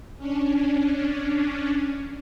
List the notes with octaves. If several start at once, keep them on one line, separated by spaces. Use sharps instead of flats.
C#4 D4